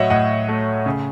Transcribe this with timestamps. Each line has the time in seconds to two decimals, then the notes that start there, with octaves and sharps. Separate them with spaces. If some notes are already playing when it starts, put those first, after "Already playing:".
Already playing: A2 F#3 C#5 D#5 E5 F#5
0.10 A2 D#5 F#5
0.48 A3
0.86 C#3